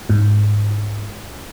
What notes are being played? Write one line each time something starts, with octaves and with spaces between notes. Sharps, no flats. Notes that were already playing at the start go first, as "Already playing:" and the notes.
G#2